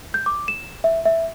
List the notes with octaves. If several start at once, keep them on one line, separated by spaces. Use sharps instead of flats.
G6
D6
E7
E5
E5